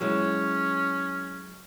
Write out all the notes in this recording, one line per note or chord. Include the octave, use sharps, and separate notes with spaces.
F#3 G#3 C#4 E4